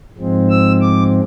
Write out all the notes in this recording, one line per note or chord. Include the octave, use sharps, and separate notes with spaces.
G#2 F3 G#3 C4
E6
D6